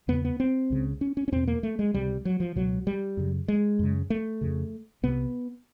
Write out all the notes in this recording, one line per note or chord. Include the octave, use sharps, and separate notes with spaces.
E2 C#3 B3
B3
C4
C#2 C#3
C#4
C#4
C#4
E2 B2 C4
A#3
A3
G#3
C#2 C3 G3
F#3
F3
C#2 B2 F#3
G3
F#2 C#3
G#3
F#2 C#3
A3
F2 C#3
C2 C3 B3